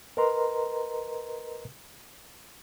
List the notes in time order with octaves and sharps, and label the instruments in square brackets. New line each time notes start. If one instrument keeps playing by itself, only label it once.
[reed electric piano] A#4 B4 D#5 A#5 C6